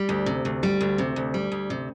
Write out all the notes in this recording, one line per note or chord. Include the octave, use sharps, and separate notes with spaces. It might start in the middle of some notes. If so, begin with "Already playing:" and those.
Already playing: G3
D2
C3
D2
G3
D2
C3
D2
G3
D2
C3